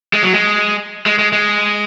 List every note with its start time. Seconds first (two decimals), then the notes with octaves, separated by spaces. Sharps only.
0.13 G#3
0.23 F#3
0.33 G#3
1.06 G#3
1.19 G#3
1.33 G#3